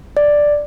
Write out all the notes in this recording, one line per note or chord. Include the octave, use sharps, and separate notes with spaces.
D5